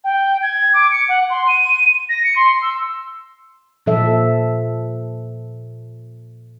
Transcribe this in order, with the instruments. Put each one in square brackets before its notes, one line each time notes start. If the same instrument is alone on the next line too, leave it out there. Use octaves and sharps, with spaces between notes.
[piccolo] G5
G#6
D6
C#7
F#5
C6
D#7
A#6
C#7
C6
E6
[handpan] A#2 F3 A4 E5